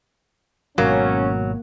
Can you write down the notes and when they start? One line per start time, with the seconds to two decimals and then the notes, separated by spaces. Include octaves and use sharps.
0.78 G#1 G#2 B2 F#3 A#3 C#4